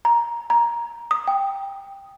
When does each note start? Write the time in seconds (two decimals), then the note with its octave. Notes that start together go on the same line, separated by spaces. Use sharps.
0.05 A#5
0.50 A#5
1.11 D#6
1.28 G5